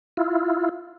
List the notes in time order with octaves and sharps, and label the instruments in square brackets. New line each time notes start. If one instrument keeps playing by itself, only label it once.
[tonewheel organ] E4 F4